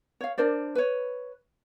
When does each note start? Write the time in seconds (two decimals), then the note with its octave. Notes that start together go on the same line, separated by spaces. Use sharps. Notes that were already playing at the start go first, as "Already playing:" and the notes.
0.21 C#5 F5
0.38 D4 A#4 C5 D5
0.75 B4 C#5